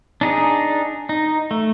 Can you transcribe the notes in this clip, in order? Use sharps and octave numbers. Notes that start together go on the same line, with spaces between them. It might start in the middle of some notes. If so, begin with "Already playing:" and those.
D4 D#4 G#4
D#4
A3